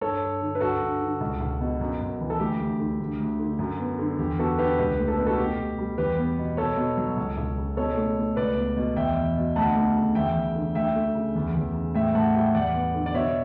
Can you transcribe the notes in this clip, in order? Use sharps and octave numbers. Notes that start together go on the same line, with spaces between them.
G2 A4 C#5
G2
D3
B4
G2 F#4 A4
G2
D3
C#2
C#2
B2
F#2
F#2
E3
A4
D2 G4
D2
D3
D2
D2
D3
F#2
B3
D3
E2 G4
B3 F#4 A4
D3 G4 B4
C#2 G4 B4
A3
A4
B2 B4
F#4 A4
B2 G4
B2
G3
E2 G4 B4
B3
B2
B2 A4 C#5
B2
F#3
C#2
C#2
C#3
B2 A4 C#5
A3
A3
C#2 B4 D5
B3
B2
E2 E5 G5
E2
B2
D2 F#5 A5
A3
C#3
E2 E5 G5
E2
D3
D2 E5 G5
A3
C#3
E2
E2
C#3
A2 E5 G5
A2 F#5 A5
G3 E5 G5
E2 D5 F#5
B3
D3
D5
B2 C#5 E5